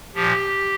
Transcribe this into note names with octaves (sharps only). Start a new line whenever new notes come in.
A#2 F3 G4